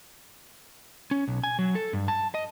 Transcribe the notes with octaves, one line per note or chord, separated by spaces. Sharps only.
C#4
B1
G#5
F#3
A4
G2
A5
D#5